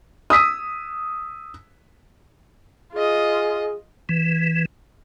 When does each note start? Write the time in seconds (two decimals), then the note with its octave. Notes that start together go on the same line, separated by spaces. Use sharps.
0.30 D#6 E6 B6 D#7
2.93 F4 G#4 D#5
4.09 E3